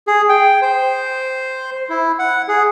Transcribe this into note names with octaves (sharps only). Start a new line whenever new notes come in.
G#4
G5
C5
E4
F#5
G#4